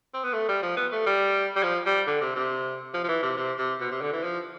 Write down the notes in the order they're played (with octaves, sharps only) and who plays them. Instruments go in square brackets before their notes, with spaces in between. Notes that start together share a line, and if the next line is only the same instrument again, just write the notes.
[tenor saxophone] C4
B3
A3
G3
F3
B3
A3
G3
G3
F3
G3
D3
C3
C3
F3
F3
E3
C3
C3
C3
B2
C3
D3
E3
F3